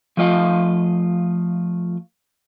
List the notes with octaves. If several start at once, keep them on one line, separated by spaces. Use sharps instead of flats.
F3 A3 F4 D#5 F5